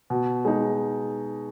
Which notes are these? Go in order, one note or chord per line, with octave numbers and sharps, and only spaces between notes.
B2
G#3 D#4